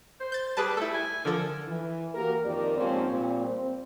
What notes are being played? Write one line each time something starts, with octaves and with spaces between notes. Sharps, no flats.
C5
G6 A6
G3 G#4 B4 A5
A3 E4 A4
G#5
D3 F3 A4 A#4
E3
A#3 F#4 G4 A#4
F2 D#3 G4 A#4 D5
G#2 F3 A#3 C4 C#4
A#2 G3 C4
C4